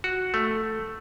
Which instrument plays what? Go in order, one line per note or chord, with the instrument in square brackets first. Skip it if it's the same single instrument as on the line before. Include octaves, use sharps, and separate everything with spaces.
[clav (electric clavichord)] F#4
A3